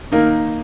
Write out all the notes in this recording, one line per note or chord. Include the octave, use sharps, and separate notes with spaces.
D#3 A#3 D#4 A#4